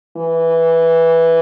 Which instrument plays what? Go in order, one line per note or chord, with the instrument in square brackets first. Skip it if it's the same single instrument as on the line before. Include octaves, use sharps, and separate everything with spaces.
[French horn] E3